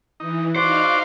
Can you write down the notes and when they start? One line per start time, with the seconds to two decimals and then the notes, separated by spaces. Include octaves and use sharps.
0.20 E3 D#4
0.56 D#4 F#4 C5 D5 F5